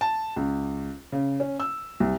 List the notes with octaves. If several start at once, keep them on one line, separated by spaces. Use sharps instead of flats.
A5
C#2
C#3
C#4
E6
C2